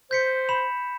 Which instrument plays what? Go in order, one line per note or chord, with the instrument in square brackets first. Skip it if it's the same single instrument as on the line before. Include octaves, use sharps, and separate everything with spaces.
[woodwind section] C5 [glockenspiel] G6 B6 C#7
[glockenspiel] B5 E7 F7